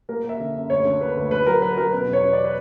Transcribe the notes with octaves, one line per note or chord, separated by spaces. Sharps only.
A#3 A#4
A#3 E5
D3
F#2
D2 C#5
D3
A#3 B4
D2
D3 B4
F#3 A#4
F#3 B4
F#3 A#4
B2 B4
E2
C#5
E2
D5
B4